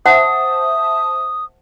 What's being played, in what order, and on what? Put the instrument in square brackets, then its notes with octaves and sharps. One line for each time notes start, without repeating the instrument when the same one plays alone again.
[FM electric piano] C5 E5 A5 [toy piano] F#5 [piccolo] D#6